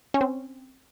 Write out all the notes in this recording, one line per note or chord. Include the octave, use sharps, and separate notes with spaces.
C#4
C4